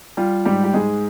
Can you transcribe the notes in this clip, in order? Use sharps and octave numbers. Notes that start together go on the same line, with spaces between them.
G3 F4
G#2 G3 G4
G4
G#2 G#3 G#4